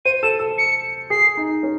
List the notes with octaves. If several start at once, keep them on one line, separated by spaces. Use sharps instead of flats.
C5 D#7
A4 E7
A4
C#7
G#4 C7
D#4
C#4